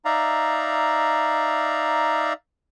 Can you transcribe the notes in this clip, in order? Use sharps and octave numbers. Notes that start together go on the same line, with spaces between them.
D#4 D5 E5 F5 A#5